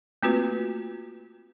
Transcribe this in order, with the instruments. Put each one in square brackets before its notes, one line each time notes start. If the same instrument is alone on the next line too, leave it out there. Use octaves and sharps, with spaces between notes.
[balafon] A3 A#3 C4 F4 F#4 B4